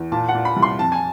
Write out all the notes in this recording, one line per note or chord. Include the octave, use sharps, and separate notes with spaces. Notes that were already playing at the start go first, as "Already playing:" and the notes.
Already playing: E2
A#2 A5
F#5
A#2
B5
C2
C6
F2 A5
G#5